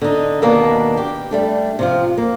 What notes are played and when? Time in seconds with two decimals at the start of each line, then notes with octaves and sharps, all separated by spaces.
0.02 D3 D#4
0.42 D#2 B2 D#3 A#3 B3 D4
0.97 G4
1.31 G3 A3 D4
1.79 C3 F3 F4
2.18 A#3